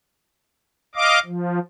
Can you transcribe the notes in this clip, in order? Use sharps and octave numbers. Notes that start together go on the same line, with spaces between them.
D#5 F5 D6
F3